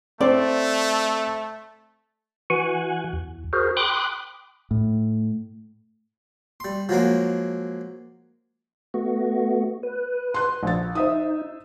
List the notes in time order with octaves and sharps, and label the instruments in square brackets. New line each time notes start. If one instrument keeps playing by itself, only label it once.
[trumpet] A3 [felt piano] C4 C5 [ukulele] D5
[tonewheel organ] E3 F#4 F#5 G#5
E2
F#4 G#4 A#4 C5
G5 B5 C6 D6 D#6 F#6
[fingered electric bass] A2
[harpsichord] G3 C6
F3 F#3 G#3 A#3
[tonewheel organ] A3 B3 F#4
B4
[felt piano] C6 F#6
A#1 A6
[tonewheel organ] D#4 [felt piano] C5 E5 D#6